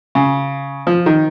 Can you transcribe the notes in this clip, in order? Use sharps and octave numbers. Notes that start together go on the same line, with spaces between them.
C#3
F3
D#3